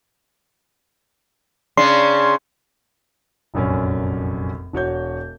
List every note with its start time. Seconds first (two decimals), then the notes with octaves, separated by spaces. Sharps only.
1.77 C#3 C#4 D4 C6
3.54 F1 A#1 F#2 C#4
4.73 E1 F#4 C#5 G6